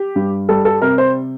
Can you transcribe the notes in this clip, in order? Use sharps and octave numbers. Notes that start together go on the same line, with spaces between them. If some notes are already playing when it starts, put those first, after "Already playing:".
Already playing: G4
G2
G3 A4
A4
C3 A#4
C5